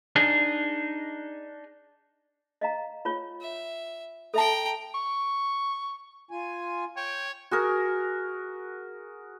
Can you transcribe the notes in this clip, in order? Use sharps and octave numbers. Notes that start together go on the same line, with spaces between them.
D4 D#4 G#4
D#5 F5 A#5
F4 C#5
E5
A4 E5 G5 A5 A#5
C#6
F4 G#5
C#5 G5
F#4 G#4 A#4